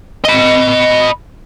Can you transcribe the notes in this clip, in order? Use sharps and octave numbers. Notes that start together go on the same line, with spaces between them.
D#5 B5